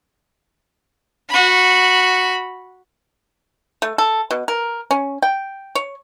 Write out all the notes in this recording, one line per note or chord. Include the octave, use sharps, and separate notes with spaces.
F#4 B5
A3
A4
B2
A#4
C#4
G5
C#5